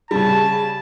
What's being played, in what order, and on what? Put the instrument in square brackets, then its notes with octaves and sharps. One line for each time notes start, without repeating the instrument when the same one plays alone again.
[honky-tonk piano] C#3 G3 [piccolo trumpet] A5